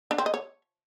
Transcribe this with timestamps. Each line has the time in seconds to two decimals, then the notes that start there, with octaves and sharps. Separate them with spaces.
0.11 D4
0.18 C4
0.26 D#5
0.34 C#5